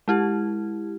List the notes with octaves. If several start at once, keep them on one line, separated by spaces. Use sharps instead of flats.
G#3 E4 G4